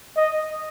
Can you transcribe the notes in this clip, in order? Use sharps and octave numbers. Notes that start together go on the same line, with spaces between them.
D#5